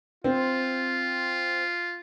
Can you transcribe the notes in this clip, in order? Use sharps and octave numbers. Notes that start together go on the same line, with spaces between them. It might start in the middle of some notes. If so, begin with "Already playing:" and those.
C4 F4